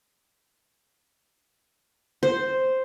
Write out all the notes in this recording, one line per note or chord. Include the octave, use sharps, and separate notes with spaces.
C5